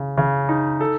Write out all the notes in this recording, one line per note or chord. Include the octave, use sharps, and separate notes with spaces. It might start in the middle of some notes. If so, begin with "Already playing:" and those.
Already playing: C#3
C#3
D#4
A4